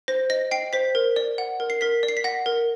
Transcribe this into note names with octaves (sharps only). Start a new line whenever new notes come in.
C5 A#6
D#5 A#6
G5 C7
C5 B6
A#4
D5
F#5
A#4
C7
A#4 B6
D5
C7
B6
F#5 A#6
A#4